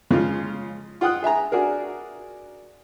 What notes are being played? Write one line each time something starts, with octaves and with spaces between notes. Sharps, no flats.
C#3 F3 G#3 F4
F4 F#5 G5 D#6 F#6
G#4 E5 G#5 A#5
D4 F#4 G#4 A#4